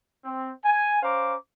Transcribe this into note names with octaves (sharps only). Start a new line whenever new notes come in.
C4
G#5
C#4 C5 F5 A#5 D6